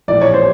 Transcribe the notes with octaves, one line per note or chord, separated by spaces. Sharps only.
A#1 A2 E3 D5
C#5
C5